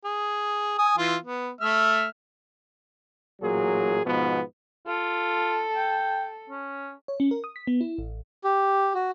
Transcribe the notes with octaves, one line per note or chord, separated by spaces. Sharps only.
G#4
G#5 D#6
E3 F4
B3
A3 E5 F6
A1 A#2 F#3 G#4
G#2 B2 F3 B3
F4 A4
G5
C#4
C#5
C#4
A#4
D#6
B6
B3
E4
A1
G4
F#4